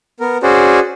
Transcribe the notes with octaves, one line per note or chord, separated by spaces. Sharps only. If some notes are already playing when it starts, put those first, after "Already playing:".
B3 A#4
C#4 F#4 G#4 C5 D5